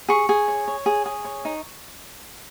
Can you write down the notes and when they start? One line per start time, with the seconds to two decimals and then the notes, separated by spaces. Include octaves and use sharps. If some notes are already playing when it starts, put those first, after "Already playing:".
0.08 G#4 C#6
0.29 G#4
0.48 C#5
0.68 C#5
0.86 G#4
1.06 G#4
1.24 C#5
1.45 D#4